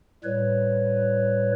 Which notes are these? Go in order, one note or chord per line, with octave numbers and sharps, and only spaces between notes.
A2 G3 B4 C#5